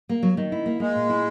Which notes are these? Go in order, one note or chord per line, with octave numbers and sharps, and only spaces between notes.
A#3
F#3
D#3
E4
A#3
G#3 A#3
A#2
E4